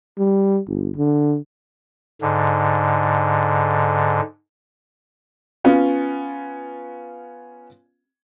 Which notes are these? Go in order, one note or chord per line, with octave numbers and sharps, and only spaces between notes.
G3
G1
D3
G#2 D3
B3 C#4 F4